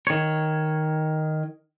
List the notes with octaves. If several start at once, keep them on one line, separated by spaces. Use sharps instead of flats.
D#3 C#5